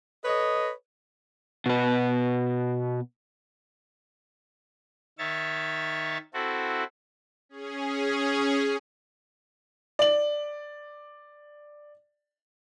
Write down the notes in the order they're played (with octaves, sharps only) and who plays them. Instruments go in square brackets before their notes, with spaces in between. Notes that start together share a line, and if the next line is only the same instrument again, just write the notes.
[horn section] A4 B4 C#5 D#5
[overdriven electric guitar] B2 B4
[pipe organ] D#3 C#5 E5 A6
C4 E4 F#4 A4
[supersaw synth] C#4 G#4
[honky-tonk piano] D5 F#7